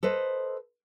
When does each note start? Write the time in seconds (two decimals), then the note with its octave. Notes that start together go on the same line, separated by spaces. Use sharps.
0.03 A4 B4 C5 D#5